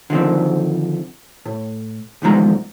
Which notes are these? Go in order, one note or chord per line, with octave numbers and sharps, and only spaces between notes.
D3 D#3 F3 C4
A2
B1 E2 D#3 F3 G#3 A#5